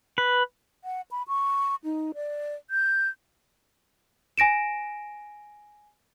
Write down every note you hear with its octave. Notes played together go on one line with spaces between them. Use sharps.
B4
F#5
B5
C#6
D#4
D5
G6
G#5 A#6 D7 E7